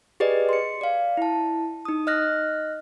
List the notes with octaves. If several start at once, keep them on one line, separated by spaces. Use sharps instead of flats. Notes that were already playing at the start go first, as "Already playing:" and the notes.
G4 G#4 B4 D5 D#5
C6 C#7
D5 F5
E4 A5
D#4 D#6
D#5 F6 F#6 A#6